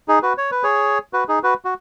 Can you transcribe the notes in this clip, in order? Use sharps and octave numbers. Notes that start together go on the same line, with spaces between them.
D#4 G#4
F#4 B4
C#5
B4
G#4 C#5
F#4 B4
D#4 G#4
F#4 B4
F#4